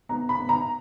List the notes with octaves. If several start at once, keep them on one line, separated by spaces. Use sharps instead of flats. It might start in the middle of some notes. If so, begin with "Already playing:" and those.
B3 A#5
B5
B3
A#5